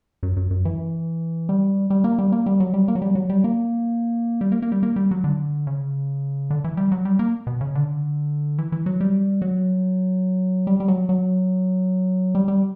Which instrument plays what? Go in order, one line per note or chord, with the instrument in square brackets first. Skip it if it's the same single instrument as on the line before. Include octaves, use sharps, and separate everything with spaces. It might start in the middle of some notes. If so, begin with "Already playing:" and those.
[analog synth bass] F#2
F#2
F#2
E3
G3
G3
A#3
G3
A#3
G3
F#3
G3
A#3
F#3
G3
F#3
G3
A#3
G3
A#3
A#3
G3
A#3
G3
F#3
D3
C#3
D3
E3
G3
F#3
G3
A#3
B2
C#3
D3
E3
E3
F#3
G3
F#3
G3
G3
F#3
F#3
G3
G3